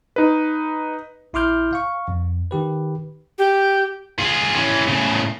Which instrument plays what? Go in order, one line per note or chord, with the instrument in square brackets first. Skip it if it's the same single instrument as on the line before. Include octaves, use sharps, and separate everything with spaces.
[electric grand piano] D#4 B4
[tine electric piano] A#1 E4 C6 D6 F6 G6
F5 C#6
F2
D#3 G4 B4
[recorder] G4
[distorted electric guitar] F4 G#4
E3 C#4
A2 C#3